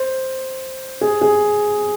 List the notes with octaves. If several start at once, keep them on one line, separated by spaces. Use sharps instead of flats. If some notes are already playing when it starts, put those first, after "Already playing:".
Already playing: C5
G#4
G#4